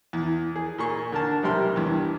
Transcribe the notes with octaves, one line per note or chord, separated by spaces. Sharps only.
E2
G#4
A#2 G#4 C#6
D3 A#4 A5
B1 C3 G3 A#4 C6
E2 G2